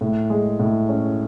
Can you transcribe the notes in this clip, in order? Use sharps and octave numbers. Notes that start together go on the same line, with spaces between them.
A2
G#3
A2
C#4